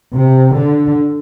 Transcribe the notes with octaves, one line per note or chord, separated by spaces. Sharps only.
C3
D3